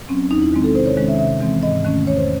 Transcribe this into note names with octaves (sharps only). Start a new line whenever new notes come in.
F#3 C4 C#4
E2 D#4
E4
D#3 G#3 C4
A4
C3 C5
C#5
D#3 G#3 C#4
E5
C3 E5
E3 G#3 C4
G#2 D#5
D#3 A3 C#4
E2 C#5
C5